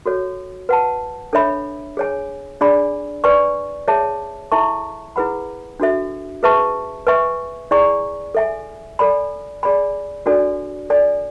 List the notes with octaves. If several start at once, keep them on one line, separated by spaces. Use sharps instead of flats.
F#4 A4 C#5
B4 F#5 A5
D4 A4 C#5 E5 B5
G#4 C#5 G#5
D4 G#4 D5 G#5 B5
B4 D5 G#5 C#6
G#4 C#5 E5 A5
E4 A4 E5 A5 C#6
E4 G#4 B4 F#5 B5
D4 F#4 A4 E5
G#4 B4 E5 A5 C#6
B4 E5 G#5 C#6
E4 G#4 D5 G#5 C#6
A4 E5 G#5
A4 D5 G#5 B5
G#4 D5 G#5 B5
D4 F#4 A4 D5 G#5
A4 D5 G#5